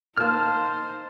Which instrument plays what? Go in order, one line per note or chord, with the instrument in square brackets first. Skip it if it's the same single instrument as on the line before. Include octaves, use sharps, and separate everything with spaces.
[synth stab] A#2 A#3 [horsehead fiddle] D#4 C5 [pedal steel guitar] A5 F6